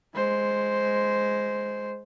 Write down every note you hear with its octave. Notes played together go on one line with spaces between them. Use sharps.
G#3 C5